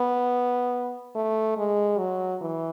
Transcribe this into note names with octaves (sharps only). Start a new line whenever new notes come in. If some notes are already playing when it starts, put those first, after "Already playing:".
Already playing: B3
A3
G#3
F#3
E3